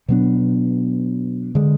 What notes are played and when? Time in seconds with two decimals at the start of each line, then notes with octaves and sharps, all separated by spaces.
0.08 B2 F#3 B3 D4
1.55 D3 G#3